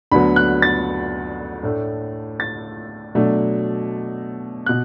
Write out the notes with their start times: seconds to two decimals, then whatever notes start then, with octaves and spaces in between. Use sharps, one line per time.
0.12 D2 D3 F#3 B3 B5
0.36 F#6
0.62 A6
1.63 A2 A3 D4
2.40 A6
3.15 B2 F#3 A3 D4
4.66 B2 F#6